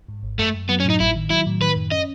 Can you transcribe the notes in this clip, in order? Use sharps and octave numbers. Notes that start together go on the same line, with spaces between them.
G#2
G#1
F#2 A3
F#2
F#3 B3
C#4
A2 D#4
G#1 E4
D#3
F#3 E4
A2
D#3 B4
F#2
C#4 D#5